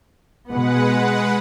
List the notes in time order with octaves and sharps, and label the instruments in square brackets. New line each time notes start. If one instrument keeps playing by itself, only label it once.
[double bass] B2 B3 [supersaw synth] G#3 B4 F#5